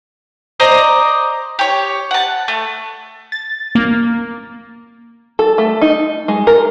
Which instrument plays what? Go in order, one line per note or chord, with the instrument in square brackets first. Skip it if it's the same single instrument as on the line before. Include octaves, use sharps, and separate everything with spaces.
[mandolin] C5 D5 D#5 A#5
G4 C#5
F#5 A5
A3
[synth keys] A6
A#3
[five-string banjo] A4
A3
D#4
G#3
A#4